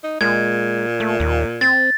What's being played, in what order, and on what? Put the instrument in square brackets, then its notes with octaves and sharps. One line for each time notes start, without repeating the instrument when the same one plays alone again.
[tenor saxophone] D#4
[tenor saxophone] A#2 [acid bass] G#3 [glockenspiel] G#6
[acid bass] A3
D#2
[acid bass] C4 [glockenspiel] A6